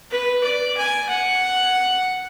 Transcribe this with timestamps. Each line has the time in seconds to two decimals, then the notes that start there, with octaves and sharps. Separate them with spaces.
0.11 B4
0.43 D5
0.77 G#5
1.09 F#5